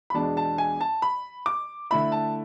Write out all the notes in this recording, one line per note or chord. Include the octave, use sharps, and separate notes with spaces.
B5
E2 B2 G#3 D4 A5
A5
G#5
A5
B5
D6
D3 A3 E4 B5
A5